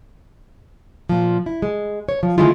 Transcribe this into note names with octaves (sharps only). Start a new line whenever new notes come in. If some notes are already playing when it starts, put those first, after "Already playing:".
A#2 F3
E4
G#3
C#5
F3
D3 D#3 G#3 A3 E4 F4